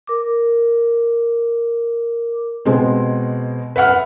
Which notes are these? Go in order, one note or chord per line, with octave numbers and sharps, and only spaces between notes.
A#4 D6
B2 G#3 C4
B4 E5 F#5 F6